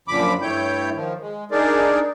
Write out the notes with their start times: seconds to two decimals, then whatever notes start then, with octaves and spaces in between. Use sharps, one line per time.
0.08 F#2 A#2 D3 F3 B5 D6
0.42 G2 A3 E4 C#5 G5 G6
0.94 D#3 F3
1.20 G#3
1.51 D4 D#4 G#4 A#4 D5